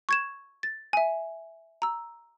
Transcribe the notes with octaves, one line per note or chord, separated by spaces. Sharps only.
C#6 G#6 E7
A6
E5 G#5
A#5 E6